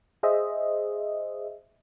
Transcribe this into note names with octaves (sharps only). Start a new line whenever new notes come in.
G#4 C5 D#5 E5